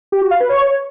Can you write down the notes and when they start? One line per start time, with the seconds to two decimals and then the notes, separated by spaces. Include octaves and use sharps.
0.12 G4
0.22 F#4
0.31 F5
0.40 B4
0.49 C#5